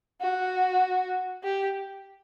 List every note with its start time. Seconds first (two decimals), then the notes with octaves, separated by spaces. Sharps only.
0.21 F#4
1.43 G4